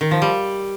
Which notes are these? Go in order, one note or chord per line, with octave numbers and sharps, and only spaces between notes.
D#3
F3
G3